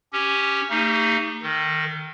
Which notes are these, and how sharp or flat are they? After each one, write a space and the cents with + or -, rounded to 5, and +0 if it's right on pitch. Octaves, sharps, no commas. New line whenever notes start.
C#4 +0 G4 +0
A3 +45 D#4 +0 G4 +45
D#3 +0 A4 +40